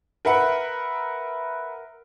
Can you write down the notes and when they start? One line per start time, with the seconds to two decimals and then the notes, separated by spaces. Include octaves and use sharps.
0.25 A#4 B4 E5 F#5